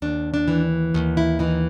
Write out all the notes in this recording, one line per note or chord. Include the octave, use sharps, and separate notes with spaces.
D#2 D4
D4
E3
D#2
E4
E3 D#4